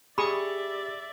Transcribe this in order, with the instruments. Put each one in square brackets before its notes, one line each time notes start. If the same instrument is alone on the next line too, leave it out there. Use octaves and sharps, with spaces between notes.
[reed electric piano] G4 [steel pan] G#4 C#6 D#6 [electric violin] D5 E5 [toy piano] B5